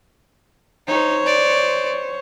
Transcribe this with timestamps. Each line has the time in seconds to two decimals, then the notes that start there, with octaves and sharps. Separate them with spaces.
0.88 D#4 C5 C#5
1.26 D5